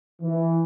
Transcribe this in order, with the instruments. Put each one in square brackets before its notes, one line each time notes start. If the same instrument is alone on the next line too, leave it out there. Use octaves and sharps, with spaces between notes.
[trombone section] E3